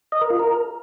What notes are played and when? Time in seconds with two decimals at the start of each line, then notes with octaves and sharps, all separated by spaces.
0.12 D#5
0.21 A#4
0.30 F4
0.39 A#4